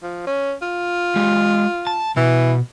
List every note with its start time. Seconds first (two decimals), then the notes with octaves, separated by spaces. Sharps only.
0.03 F3
0.27 C#4
0.62 F4
1.16 G#3 G4
1.87 A5
2.16 B2 E3